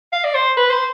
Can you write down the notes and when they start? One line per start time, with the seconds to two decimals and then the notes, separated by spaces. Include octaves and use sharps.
0.13 F5
0.24 D5
0.35 C5
0.57 B4
0.70 C5